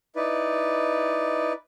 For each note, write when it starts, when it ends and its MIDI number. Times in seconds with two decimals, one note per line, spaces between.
0.16 1.53 63
0.16 1.53 64
0.16 1.53 71
0.16 1.53 74